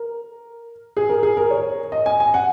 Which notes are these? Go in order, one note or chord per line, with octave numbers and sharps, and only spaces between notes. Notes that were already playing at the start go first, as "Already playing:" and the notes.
Already playing: A#4
G#4
A#4
G#4
A#4
C#5
D#5
G#5
G#5
F#5